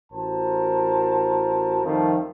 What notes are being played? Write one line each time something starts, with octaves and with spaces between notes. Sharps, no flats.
A1 F#4 A#4 C5 A5
F2 D#3 F3 G3 A3